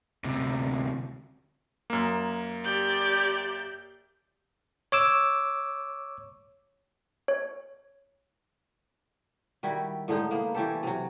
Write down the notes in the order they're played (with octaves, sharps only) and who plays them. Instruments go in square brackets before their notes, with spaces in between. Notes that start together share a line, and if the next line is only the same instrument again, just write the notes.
[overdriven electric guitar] D2 C3
[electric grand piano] F#2 A#3
[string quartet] G4 D5 G6
[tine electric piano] C#5 D6 E6
[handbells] C#5
[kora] D#3 G3 E4 F#4
A2 D3 G#3 D#4
A#3 B3
E3 C#4 G4 A4
C3 F#3